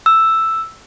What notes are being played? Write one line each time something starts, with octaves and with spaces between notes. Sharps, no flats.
E6